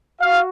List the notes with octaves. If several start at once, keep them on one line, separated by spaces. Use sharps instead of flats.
F#4 F5